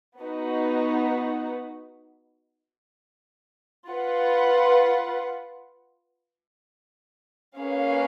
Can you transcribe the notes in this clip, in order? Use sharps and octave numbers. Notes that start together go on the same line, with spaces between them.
B3 D#4 F#4 B4
F4 B4 F#5
A#3 C#4 G#4 B4 F5